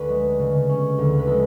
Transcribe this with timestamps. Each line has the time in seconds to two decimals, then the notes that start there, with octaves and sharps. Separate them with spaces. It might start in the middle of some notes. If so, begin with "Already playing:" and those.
Already playing: D2 C#4 B4
0.09 G#3
0.39 C#3
0.69 C#4
0.98 D2
1.19 B4
1.27 G#3 A4